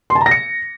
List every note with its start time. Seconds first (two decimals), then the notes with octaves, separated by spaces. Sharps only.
0.10 C6
0.15 A5
0.21 A#5
0.26 A#6
0.31 C#7